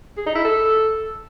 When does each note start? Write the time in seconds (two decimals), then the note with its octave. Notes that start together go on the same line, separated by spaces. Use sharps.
0.17 G#4
0.26 D#4
0.35 E4
0.44 A4